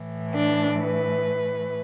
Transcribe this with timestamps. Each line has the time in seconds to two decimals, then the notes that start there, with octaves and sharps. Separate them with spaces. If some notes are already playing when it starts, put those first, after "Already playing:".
Already playing: A2 E3
0.34 D4
0.80 B4